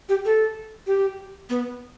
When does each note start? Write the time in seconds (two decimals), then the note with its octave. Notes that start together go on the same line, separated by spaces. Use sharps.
0.09 G4
0.25 A4
0.87 G4
1.50 B3